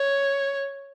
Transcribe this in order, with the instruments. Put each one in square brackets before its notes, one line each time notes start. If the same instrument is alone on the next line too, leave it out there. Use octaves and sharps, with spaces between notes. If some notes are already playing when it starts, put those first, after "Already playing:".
Already playing: [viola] C#5